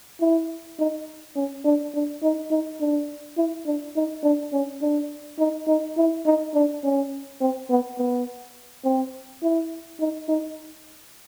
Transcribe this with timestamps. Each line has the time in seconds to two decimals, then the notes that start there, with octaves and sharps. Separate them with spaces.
0.20 E4
0.79 D#4
1.36 C#4
1.65 D4
1.94 D4
2.23 D#4
2.51 D#4
2.80 D4
3.37 E4
3.66 D4
3.96 D#4
4.24 D4
4.53 C#4
4.82 D4
5.39 D#4
5.68 D#4
5.97 E4
6.26 D#4
6.55 D4
6.83 C#4
7.41 C4
7.70 B3
7.98 B3
8.85 C4
9.43 E4
10.00 D#4
10.29 D#4